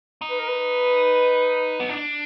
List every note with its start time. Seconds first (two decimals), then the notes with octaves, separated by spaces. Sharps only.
0.22 D#4
0.30 B4
0.39 A#4
0.48 B4
1.80 B3
1.89 D4